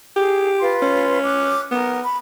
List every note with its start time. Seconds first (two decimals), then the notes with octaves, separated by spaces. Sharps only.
0.16 G4 G#4
0.59 F4 B4 C6
0.82 C#4
1.23 D6 F#6
1.71 B3 A#4
2.03 B5